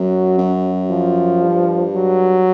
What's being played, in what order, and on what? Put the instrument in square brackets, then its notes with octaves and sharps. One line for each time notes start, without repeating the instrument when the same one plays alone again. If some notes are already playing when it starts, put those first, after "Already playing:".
Already playing: [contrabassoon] F#2 [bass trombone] F#3
[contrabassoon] F#2
[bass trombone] F3
[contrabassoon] G2
[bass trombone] F#3